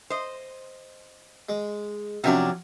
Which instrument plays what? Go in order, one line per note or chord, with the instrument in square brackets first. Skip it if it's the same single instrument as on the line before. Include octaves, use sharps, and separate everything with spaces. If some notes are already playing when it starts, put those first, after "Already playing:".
[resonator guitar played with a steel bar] C5 D#5
[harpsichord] G#3
[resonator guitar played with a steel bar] C3 C#4 D4 [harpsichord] F3 F#3 A#4